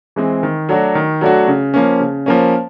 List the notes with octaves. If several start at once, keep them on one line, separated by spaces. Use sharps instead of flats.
E3 G#3 C4
D#3
F#3 A3 D4 F#4
D#3
F#3 A3 D4 F#4
C#3
F3 A#3 C#4
C#3
F3 A#3 C#4